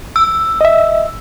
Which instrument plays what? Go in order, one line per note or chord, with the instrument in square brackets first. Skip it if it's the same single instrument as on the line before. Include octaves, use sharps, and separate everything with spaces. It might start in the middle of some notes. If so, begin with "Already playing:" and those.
[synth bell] E6
[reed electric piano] D#5 E5